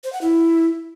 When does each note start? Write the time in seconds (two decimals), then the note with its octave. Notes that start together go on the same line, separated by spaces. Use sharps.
0.04 C5
0.12 F#5
0.21 E4